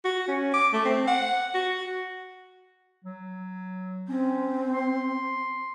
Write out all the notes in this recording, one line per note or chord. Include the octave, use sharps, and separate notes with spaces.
F#4
C#4
D6
A3
C4
F#5
F#4
F#3
C4 C#4
C6